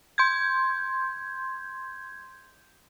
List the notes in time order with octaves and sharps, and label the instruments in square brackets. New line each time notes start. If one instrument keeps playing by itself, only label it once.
[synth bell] C6 G6 G#6